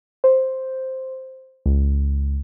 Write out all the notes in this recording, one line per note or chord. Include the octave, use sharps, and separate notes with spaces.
C5
C#2